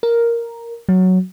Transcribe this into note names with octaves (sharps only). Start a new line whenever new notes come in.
A#4
F#3